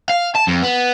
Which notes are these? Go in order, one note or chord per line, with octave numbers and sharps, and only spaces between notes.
F5
A5
F2
B3